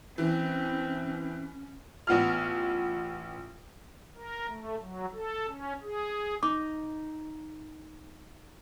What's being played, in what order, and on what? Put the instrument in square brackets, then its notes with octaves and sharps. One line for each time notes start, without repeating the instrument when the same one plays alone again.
[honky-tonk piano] E3 [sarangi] C4 [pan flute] C#4
[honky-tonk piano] A1 B3 F4 F6
[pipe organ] A#4
A3
F#3
A4
C#4
G#4
[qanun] D#4 [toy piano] D6